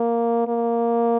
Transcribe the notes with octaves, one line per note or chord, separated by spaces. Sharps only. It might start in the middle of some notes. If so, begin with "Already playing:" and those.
Already playing: A#3
A#3